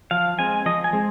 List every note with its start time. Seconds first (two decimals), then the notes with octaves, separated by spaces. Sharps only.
0.11 F3 F5
0.39 G#3 C4 G#5
0.66 F3 D#5
0.84 G#5
0.93 G#3 C4